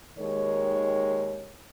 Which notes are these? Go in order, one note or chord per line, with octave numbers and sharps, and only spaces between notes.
D#2 D#3 G#3 C#5